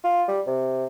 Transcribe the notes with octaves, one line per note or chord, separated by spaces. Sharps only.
F4
G3
C3